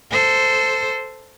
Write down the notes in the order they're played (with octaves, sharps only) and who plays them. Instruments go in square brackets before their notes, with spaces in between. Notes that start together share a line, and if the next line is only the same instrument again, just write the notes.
[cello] A4 C5